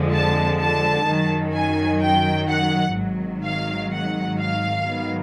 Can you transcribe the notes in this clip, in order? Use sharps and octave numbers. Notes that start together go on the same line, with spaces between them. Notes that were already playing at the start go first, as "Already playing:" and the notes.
Already playing: F2 D3 F3 G#3
A5
A5
F#2 D#3 F#3
G#5
G5
F#5
G#1 G#2 D#3 F#3
F5
F#5
F5
G#2 D#3 F#3 B3